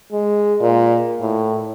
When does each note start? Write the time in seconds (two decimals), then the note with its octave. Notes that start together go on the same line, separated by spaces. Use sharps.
0.12 G#3
0.61 A#2
1.21 A2